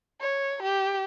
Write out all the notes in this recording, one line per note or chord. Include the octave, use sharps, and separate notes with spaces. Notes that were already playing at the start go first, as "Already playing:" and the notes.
C#5
G4